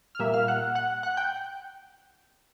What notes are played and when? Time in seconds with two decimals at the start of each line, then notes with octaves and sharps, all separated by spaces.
0.15 F6
0.19 A#2 G3 A#3 E5 E6
0.34 F5 F6
0.48 F#5 F#6
0.75 F#5 F#6
1.03 F#5 F#6
1.17 G5 G6